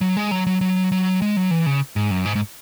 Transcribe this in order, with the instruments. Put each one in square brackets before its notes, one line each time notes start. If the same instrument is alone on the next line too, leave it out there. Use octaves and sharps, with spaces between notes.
[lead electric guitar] F#3
G#3
F#3
F#3
F#3
F#3
G#3
F#3
E3
C#3
G#2
F#2
G#2
G#2